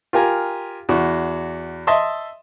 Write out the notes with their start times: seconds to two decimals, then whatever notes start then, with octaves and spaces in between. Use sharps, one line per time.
0.13 F4 G4 A#4 G#5 A#5
0.89 E2 F#4
1.87 D#5 E5 A5 C6 E6